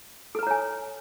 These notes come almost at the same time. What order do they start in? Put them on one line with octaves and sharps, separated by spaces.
A4 B4 A#5 C#5 G#5